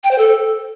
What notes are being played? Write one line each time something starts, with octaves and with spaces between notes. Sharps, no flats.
G5
C5
A4